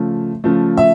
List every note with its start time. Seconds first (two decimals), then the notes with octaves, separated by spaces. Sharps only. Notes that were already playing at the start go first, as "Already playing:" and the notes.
Already playing: C#3 F3 A3
0.44 C#3 F3 A3
0.77 E5